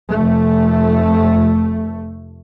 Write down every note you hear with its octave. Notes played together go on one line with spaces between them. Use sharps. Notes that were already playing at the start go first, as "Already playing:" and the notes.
F1 A3